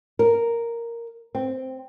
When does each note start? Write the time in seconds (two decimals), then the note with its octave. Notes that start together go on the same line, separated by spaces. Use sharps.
0.19 A#4
1.35 C4